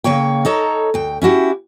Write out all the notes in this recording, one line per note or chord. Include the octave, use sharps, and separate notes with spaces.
C#3 A#3 C#5 G5
D#4 A4 C#5 A#5
D2 G5
C#4 E4 F#4 G4